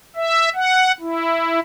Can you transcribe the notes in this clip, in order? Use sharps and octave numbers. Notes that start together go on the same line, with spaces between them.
E5
F#5
E4